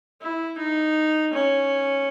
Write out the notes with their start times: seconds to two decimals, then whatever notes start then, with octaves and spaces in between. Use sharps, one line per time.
0.21 E4
0.58 D#4
1.33 C#4